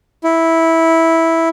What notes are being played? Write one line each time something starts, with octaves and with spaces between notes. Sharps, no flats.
E4